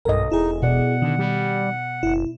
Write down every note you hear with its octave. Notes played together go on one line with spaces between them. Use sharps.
B1 G2 A4 A#4 D#5
E1 D#4 E4 G#4
B2 D5 F#5
D3 D#3
G3
F#1 E4